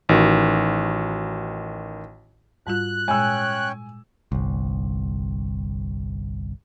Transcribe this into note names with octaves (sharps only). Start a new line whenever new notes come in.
A1 D#3 F#4
G#2 G3 F4 F#6
A#2 G#3 C#4 C#5 G5 G#5 E6
G1 C2